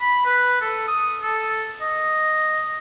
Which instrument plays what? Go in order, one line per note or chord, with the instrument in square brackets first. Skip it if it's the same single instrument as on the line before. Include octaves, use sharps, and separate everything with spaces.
[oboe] B5
B4
A4
D#6
A4
D#5